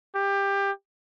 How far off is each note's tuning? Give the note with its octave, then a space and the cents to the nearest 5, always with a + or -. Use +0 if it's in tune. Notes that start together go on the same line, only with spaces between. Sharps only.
G4 +20